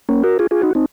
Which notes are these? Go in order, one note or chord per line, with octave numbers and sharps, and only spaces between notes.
A#3 C#4
F#4 A#4
F4 G#4
F4 G#4
D#4 F#4
C4 D#4